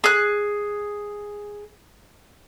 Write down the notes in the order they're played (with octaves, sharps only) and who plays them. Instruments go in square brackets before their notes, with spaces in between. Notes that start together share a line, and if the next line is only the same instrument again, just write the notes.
[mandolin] G#4 F#6